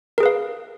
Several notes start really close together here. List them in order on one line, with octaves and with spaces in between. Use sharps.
A#4 G#4 B4 F5